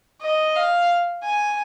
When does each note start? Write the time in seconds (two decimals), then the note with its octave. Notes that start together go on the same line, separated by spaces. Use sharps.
0.21 D#5
0.55 F5
1.23 G#5